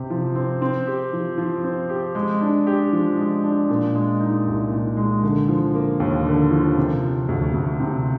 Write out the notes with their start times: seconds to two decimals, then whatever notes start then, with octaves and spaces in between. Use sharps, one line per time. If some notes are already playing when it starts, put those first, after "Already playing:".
Already playing: C3 C4 G4
0.10 F3
0.35 C4
0.61 C4
0.87 G4
1.13 F3
1.38 F3
1.64 C4
1.89 G4
2.15 G#3
2.41 D4
2.67 G4
2.93 F3
3.18 G#3
3.44 D4
3.70 A#2
3.95 G#3
4.20 D#4
4.46 C2
4.71 A#2
4.97 G#3
5.24 D3
5.48 F3
5.74 A#3
6.00 D#2
6.26 D3
6.51 F3
6.77 C3
7.03 F3
7.29 D2
7.54 D2
7.80 C3